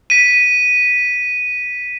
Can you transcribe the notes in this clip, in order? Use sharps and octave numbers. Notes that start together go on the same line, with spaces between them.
B6 D#7